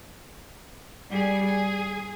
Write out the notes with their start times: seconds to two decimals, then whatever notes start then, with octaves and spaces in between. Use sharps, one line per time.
1.11 G3 G#4
1.46 G#4